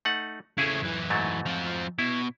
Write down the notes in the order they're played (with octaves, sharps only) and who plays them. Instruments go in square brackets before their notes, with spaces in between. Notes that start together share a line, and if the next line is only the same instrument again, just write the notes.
[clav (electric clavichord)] A3 D#4 F#5
[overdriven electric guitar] C#3 A3 [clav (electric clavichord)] E4 G#4
[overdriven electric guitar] F#2 E3
[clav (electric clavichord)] G#2 F#3 A3
[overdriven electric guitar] F3 C4
[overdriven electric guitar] B2 [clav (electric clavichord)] E4